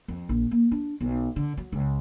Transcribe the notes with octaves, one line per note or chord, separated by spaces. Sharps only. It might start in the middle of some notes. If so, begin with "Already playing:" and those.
F2
A#1
A#3
D4
B1
D3
F#3
C#2